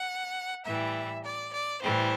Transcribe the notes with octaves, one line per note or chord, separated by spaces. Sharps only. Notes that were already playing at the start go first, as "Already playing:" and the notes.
Already playing: F#5
A2 E3 G3 E5
D5
D5
A2 E3 G3 C5